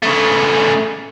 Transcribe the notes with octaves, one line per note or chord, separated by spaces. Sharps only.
C#3 A3